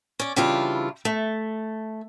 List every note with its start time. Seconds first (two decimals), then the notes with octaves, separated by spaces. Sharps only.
0.20 C#4 D5
0.36 C#3 E3 G3 D4 E4 F4
1.05 A3